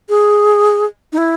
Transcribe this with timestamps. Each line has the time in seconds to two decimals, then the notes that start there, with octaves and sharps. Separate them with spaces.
0.09 G#4
1.12 D#4
1.18 E4